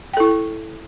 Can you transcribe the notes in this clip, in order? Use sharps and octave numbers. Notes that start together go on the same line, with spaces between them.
E4 A4 G5